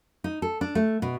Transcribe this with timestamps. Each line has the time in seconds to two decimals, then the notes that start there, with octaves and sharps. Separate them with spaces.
0.24 D#4
0.42 A4
0.61 D4
0.75 A3
1.02 B2